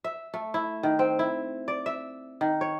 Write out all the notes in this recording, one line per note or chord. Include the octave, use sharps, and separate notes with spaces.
E5
A3
E4
D#3
C4
E4
D5
E5
D#3
C#5